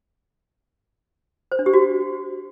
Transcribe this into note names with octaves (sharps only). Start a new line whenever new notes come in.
C5
D4
G4
F#4